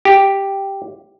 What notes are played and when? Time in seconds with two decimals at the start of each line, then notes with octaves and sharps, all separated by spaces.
0.05 G4